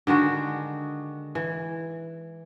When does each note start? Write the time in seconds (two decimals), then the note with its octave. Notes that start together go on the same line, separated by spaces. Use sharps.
0.07 D3 D#3 G#3 F#4
1.35 E3